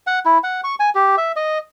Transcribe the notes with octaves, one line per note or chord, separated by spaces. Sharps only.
F#5
E4
F#5
C#6
G#5
G4
E5
D#5